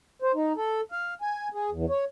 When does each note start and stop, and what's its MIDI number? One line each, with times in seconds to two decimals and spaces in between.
0.22 0.32 72
0.35 0.52 63
0.56 0.81 69
0.92 1.14 77
1.21 1.48 80
1.54 1.70 68
1.71 1.85 40
1.90 2.05 73